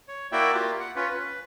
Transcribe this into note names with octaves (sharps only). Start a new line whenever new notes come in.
C#5
A#3 E4 F#4 D5 E5 G5
A#3 F4 G4
F#5
C#4 F4 B4
B4